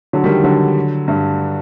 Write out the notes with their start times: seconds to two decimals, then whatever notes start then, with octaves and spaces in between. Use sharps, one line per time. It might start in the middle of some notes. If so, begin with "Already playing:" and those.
0.13 D3 F#3
0.24 D#3 G3
0.44 D3 F#3
1.08 G2